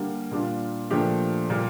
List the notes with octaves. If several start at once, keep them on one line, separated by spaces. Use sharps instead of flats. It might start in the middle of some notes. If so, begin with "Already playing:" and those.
Already playing: D3 G3 A#3
A#2 G3 D4 F4
A#2 F3 A3 D4 G4
A#2 G3 A#3